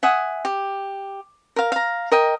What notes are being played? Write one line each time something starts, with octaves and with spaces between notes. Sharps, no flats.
E5 F#5 G#5 D#6
G4
A#4 F5
F5 A#5
A#4 D#5 G5